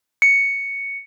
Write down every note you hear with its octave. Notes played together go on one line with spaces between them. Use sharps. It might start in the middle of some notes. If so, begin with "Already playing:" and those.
C#7